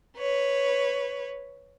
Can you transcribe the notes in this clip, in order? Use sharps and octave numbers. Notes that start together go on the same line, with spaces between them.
B4 C#5